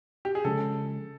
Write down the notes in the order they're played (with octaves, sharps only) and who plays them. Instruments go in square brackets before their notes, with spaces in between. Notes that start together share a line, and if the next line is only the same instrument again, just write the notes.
[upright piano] G4
G#4
[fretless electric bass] C#3 F3 G#3 C#4 [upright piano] A4